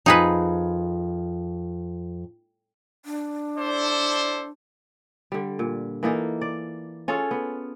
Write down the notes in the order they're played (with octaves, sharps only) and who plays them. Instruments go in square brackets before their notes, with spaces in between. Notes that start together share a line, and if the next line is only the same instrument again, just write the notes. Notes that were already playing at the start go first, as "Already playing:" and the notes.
[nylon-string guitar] F2 [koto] D#4 G#4 B4
[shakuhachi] D4
[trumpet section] E4 A4 C5 [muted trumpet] D5
[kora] D3 G3
A#2
E3 A#3 D#4 A4
D5
C#4 F4 G#4 A4
B3